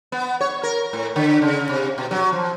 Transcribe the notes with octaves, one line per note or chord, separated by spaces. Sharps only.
B3
C#5
A#4
A2
D3
C#3
C3
B2
F#3
F3